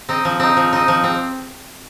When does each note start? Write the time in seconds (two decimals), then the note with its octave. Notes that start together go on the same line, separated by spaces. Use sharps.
0.09 C4 D#4
0.25 F3
0.40 C4 D#4
0.57 F3
0.73 C4 D#4
0.88 F3
1.04 C4